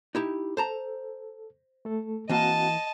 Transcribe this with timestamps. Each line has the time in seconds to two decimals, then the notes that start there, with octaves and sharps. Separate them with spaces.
0.15 D#4 E4 G4
0.57 A4 C5 A5 A#5
1.85 A3 A4
2.30 E3 A#3 C4 F#4 D#5 F#5 A5